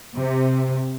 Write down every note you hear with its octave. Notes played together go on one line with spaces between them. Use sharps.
C3